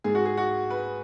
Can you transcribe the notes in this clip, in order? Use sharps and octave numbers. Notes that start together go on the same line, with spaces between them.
G#2 G#3 G#4
F#4
G#4
F#4
B4